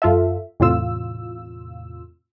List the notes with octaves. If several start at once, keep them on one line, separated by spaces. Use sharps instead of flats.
F#2 F4 A4 E5
E2 A2 C3 F4 E6